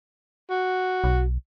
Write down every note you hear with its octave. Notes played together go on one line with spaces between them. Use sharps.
F#4
B1